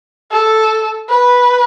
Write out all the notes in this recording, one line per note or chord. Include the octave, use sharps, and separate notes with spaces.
A4
B4